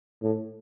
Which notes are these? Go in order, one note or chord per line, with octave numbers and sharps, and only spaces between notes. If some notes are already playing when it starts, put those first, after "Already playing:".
A2